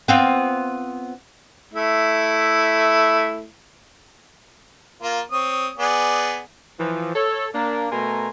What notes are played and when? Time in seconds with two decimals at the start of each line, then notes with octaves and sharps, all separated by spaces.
0.08 B3 C4 F4
1.74 A3 E4
5.02 A#3 F4
5.32 C4 C#5 D#6
5.78 B3 G#4 D5
6.80 E3 F3
7.15 A4 C#5
7.54 A#3 D4
7.92 B2 A3 A#4 G#5 A#5 C6